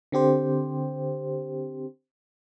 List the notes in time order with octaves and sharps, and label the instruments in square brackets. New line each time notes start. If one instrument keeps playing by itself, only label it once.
[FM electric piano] D3 C4 G4 C5